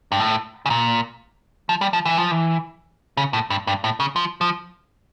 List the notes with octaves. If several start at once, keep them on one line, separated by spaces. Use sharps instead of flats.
G2
A2
C#3
A#2
F3
G3
F3
E3
F3
E3
C#3
A2
G2
G2
A2
C#3
F3
F3